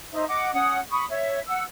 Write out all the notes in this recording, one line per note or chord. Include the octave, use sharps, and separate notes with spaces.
D#4 C5 D#5 E5
D#5 F#5 D6
C#4 F#5 D#6
B5 C#6 D#6
C#5 E5
F#5 E6